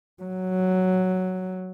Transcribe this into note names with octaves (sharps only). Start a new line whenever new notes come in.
F#3